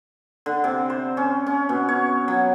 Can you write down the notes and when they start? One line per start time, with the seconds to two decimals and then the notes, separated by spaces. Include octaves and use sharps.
0.46 D3
0.64 C3
0.90 C5
1.17 C#4
1.46 C#4
1.69 B2
1.89 C#5
2.28 F#3